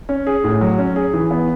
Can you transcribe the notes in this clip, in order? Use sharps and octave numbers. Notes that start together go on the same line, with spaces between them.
C#4
G#4
A2
F#3
C#4
G#4
E3
B3